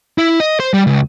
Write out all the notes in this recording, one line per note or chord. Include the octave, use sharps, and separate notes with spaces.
E4
D#5
C5
G3
C#2